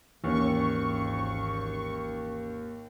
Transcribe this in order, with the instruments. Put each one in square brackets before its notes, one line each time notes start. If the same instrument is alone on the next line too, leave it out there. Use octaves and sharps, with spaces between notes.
[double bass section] G#1 [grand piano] D#2 [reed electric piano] E3 C#4 [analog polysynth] C#6